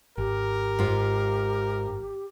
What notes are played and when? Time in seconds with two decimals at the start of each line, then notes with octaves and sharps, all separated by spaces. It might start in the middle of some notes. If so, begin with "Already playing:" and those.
0.18 G#1 G4 A#4
0.79 G#2 F4